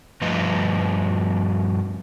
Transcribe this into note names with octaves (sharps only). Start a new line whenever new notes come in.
G2 F3 A3 B4 D#5